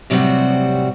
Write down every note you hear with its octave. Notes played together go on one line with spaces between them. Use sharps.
A2 C3 F#3 G3 C4 F#4